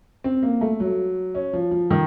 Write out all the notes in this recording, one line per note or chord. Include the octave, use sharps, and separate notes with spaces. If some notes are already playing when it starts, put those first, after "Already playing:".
C4
A#3
A3
F#3
C#4
F3
F3
D#3